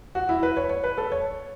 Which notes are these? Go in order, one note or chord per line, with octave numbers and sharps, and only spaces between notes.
F#4
E4
B4
C#5
C#5
B4
A4
C#5